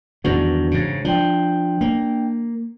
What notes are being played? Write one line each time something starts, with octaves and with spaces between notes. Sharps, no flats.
E2 G2 D#3 E3 D4 F#4
G#2 C#3
F3 D4 G5
A#3